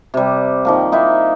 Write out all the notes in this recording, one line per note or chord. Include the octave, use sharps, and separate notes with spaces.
C3 G3
D#3 F3 A#3
A#3 D#4 E4